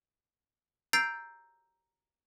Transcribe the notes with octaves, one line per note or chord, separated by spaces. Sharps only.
A#5 E6 G6 A6 C7 D7